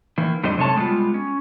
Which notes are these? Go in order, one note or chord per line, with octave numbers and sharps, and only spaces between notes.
D#3 E3 A#3
F2 D3 G3 D#4 C5 D#5
F#2 C3 G#3 A4 C#5 A5
G3 G#3 A#3 B3 F4
C#4